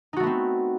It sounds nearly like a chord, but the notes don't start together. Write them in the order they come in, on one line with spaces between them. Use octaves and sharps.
D#4 F#4 A3 B3 C4